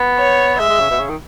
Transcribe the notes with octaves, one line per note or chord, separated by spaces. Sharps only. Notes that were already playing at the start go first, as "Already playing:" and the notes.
Already playing: B3
C#5
G#3 E5
G#3
C#3
B2
C#3
D#3